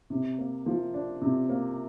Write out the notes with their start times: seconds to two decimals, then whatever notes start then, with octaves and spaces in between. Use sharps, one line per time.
0.10 C3
0.38 A#3
0.66 F3
0.94 D4
1.22 C3
1.49 A#3